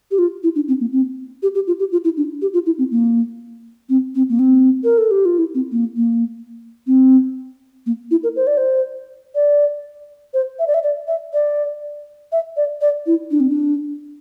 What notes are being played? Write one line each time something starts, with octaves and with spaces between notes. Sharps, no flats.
G4
F4
E4
D4
C4
A#3
C4
G4
G4
F4
G4
F4
E4
D4
G4
F4
E4
C4
A#3
C4
C4
A#3
C4
A#4
A4
G4
F4
E4
C4
A#3
A#3
C4
A#3
E4
A#4
C5
D5
C5
D5
C5
E5
D5
E5
D5
E5
D5
E5
D5
D5
E4
D4
C4
D4